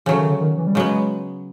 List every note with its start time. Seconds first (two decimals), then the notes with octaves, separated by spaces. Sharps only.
0.06 C#3 E3 F#3 A3
0.17 D#3
0.30 D3
0.40 D#3
0.58 E3
0.67 G3
0.75 C#3 F#3 G#3 B3